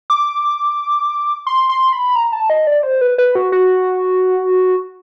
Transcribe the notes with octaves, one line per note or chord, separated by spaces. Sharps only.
D6
C6
C6
B5
A#5
A5
D#5
D5
C5
B4
B4
F#4
F#4